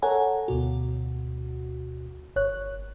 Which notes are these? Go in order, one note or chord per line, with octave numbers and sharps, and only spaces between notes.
A4 A#4 C#5 F#5 G#5 A#5
D2 B2 F#4
G1 C#5 F#6